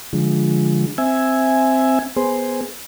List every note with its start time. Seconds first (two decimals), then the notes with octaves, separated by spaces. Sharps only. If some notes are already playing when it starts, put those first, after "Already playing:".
0.13 D3 F3 G#3
0.98 C4 E5 G#5
2.17 B3 G#4 C5